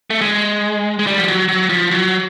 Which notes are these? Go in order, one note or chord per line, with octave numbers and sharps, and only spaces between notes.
A3
G#3
G#3
G3
F3
F#3
F#3
F3
F#3